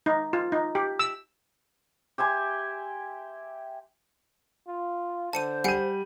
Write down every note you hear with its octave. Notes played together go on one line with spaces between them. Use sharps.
D#4
F4
D#4
G4
E6
G4 E5 G#5 C6
F4
D3 C5 A5 C#7 D#7
G3 F#5 G#5 C#7 D#7